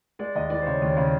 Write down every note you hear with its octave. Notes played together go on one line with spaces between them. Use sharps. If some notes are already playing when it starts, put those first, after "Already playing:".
G#3 D5
D#2 D#5
E3 D5
C5
C#3 C#5
D#2 C#5
C#3